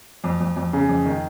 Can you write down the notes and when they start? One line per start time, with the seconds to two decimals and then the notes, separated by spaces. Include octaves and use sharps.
0.24 F2
0.41 F2
0.56 F2
0.73 C#3
0.89 F2
1.05 D#3